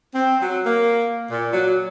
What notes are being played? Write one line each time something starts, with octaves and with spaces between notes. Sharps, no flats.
C4
F#3
A#3
A#2
F#3